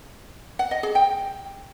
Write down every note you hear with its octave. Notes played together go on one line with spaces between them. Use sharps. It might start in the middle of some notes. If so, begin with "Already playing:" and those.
F#5
D#5
G#4
G5